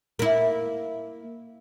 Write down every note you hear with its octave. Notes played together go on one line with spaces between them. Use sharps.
A#3 E4